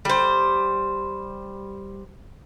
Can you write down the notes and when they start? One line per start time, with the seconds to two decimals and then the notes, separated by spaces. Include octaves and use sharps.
0.05 G3 C5